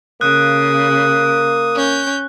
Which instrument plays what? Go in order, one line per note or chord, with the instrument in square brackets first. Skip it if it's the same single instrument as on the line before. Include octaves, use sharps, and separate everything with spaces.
[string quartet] C#3 [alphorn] A#3 [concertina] D#6 [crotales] F#6
[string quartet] C#4 G6